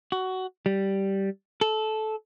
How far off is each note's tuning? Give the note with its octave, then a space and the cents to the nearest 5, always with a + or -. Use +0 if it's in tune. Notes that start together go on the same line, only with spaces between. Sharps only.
F#4 +15
G3 -10
A4 -15